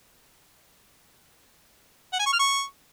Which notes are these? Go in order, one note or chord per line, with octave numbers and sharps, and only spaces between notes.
F#5
G#5
C#6
F6
C#6